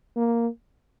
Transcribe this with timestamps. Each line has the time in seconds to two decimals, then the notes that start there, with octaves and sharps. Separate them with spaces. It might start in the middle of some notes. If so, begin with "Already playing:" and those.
0.16 A#3